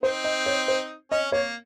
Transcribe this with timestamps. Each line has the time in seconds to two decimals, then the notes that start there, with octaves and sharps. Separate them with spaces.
0.03 C4 D#4 C5
0.24 D#5
0.46 C#5
0.68 C5
1.11 C#4 D#5
1.32 A#3 C#5